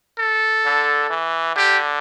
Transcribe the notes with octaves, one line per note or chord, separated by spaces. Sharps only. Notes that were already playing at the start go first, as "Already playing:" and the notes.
A4
D3
E3
D3 G4